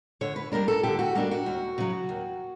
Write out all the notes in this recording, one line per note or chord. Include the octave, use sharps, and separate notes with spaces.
D3 C#5
B4
G3 A#3 D4 A#4
A4
D3 G4
F#4
G3 A#3 D4
F#4
D#2
C#3 F#3
D#2